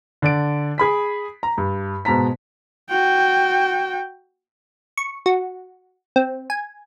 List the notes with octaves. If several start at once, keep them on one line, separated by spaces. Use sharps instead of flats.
D3 D5 D7
G#4 B5 B6
A#5
G2
G#2 B2 A5 A#5 B6
F#4 G5
C#6
F#4
C4
G#5